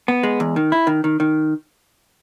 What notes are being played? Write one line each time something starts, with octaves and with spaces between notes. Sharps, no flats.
B3
G#3
E2
D#3
E4
D#3
D#3
D#3